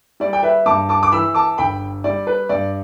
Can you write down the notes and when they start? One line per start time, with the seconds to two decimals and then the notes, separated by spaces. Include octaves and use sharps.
0.20 G3 D5
0.33 G5
0.43 B4 E5
0.66 G2 A5 D6
0.89 A5 D6
1.03 D6
1.12 E3 B5 E6
1.34 A5 D6
1.58 G1 G5 B5
2.04 G3 D5
2.27 B4
2.49 G2 D5